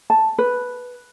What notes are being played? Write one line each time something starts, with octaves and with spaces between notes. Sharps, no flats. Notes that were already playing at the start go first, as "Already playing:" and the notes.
A5
B4